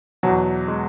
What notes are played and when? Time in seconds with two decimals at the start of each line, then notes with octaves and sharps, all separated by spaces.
0.23 E2 B2 F#3
0.68 G#3